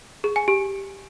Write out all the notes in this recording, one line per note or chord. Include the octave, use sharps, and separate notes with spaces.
G#4
G#5
G4